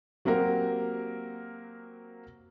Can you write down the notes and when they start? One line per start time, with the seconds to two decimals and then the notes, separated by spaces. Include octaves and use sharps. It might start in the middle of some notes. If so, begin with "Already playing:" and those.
0.25 F#3 A#3 C4 G4 A#4 F#5